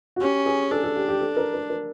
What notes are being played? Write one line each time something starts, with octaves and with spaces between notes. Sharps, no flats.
F#4
C#4 G4
G#4
D4 A4
A4
G4
G4
A4
A#4
A#4
A#4